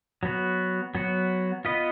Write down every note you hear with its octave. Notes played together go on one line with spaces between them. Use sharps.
F#3 B3 F#4
F#3 B3 F#4
B3 F4 B4 D#5